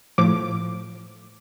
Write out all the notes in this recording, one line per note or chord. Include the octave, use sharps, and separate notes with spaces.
A2 F3 D6